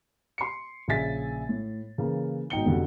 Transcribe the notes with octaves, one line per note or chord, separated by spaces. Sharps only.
C6 C#7
A#1 C#3 E5 G#5 A6 B6
A2
C#3 E3 A#3
G#1 B2 D#4 G5 C#7 G7
F1 F2 B2 D3